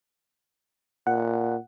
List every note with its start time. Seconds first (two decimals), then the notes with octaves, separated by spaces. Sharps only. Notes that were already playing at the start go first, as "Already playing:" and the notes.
1.07 A#2 F#5